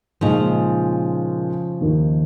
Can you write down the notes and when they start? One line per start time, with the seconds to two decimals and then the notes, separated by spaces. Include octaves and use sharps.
0.21 A#2 C#3 F3 G#3 D#4
1.80 D#2 D#3 A#3 D#4